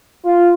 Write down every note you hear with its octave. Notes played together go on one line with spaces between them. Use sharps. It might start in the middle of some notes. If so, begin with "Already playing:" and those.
F4